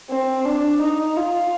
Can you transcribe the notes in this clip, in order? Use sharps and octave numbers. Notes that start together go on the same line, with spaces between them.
C4
D4
D#4
F4